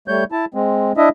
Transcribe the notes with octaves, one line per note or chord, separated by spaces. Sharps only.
G3 A3 C#5 G6
E4 A5
G#3 C4
D4 E4 D#5 E5